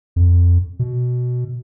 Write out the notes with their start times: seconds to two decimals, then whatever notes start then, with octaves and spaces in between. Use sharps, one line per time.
0.16 F2
0.79 B2